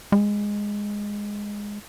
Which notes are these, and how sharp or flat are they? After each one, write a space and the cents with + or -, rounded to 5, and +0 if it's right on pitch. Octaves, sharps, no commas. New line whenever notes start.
G#3 -10